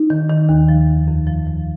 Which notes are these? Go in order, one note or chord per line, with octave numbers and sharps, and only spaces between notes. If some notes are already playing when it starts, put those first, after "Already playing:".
Already playing: D#4
D#3
D#3
D#2
F3
F2
F2
F3
F3